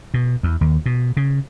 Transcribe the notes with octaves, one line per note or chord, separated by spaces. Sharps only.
B2
E2
D#2
B2
C#3